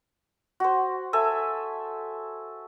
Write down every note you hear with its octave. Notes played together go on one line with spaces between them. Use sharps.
F#4 C5
A4 E5 G#5